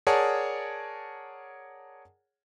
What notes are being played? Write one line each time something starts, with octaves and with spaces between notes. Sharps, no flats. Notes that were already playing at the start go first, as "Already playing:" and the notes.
G#4 A#4 C#5 D5 F#5 A5